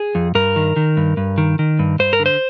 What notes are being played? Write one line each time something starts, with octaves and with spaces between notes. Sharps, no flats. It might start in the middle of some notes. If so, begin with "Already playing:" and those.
Already playing: G#4
F2
G2 A#4
D#3
D#3
G2
G2
D#3
D#3
G2
G2 C5
A#4
D3
C5